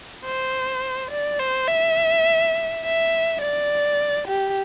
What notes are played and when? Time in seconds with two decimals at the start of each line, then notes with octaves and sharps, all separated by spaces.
0.25 C5
1.11 D5
1.39 C5
1.68 E5
2.84 E5
3.41 D5
4.28 G4